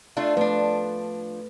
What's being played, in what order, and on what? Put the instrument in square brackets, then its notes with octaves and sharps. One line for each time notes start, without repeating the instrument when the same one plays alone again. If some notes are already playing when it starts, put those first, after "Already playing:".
[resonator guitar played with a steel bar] A3 D4 F4
[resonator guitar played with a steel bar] F3 D4 [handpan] A3 B4